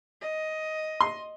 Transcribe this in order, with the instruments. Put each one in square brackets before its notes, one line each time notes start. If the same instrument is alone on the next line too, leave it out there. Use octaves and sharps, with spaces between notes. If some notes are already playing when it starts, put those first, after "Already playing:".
[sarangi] D#5
[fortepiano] C6